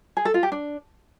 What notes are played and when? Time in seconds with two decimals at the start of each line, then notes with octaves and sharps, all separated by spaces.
0.17 G#4
0.25 A4
0.34 F4
0.43 G4
0.52 D4